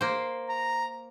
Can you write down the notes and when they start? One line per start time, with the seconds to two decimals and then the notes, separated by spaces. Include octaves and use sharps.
0.01 A#3 C5
0.49 A#5